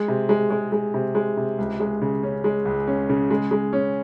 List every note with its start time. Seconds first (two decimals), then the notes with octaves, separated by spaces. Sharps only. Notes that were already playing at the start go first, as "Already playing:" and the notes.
Already playing: G#3
0.08 C3
0.29 G#3
0.50 G#3
0.72 G#3
0.94 C3
1.15 G#3
1.37 C3
1.58 C#2
1.80 G#3
2.02 C#3
2.23 C#4
2.44 G#3
2.65 C#2
2.87 C#4
3.09 C#3
3.30 G#3
3.51 G#3
3.73 C#4